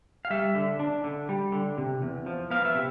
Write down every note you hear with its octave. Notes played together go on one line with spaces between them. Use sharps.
F5
G3 E5
D3
D4
D3
G3
D3
C3
E2
F3
B3 F5
E5
C3